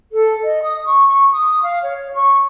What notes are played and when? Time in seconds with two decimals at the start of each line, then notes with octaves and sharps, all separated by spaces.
0.12 A4
0.44 D#5
0.63 D#6
0.85 C#6
1.08 C#6
1.32 D#6
1.61 F5
1.82 C#5
2.14 C#6